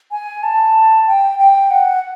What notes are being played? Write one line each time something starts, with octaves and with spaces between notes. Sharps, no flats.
G#5
A5
G5
G5
F#5